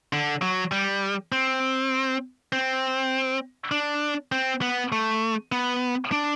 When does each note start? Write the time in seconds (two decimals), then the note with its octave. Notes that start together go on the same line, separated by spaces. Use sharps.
0.13 D3
0.42 F#3
0.72 G3
1.32 C4
2.53 C4
3.71 D4
4.32 C4
4.62 B3
4.92 A3
5.52 B3
6.12 D4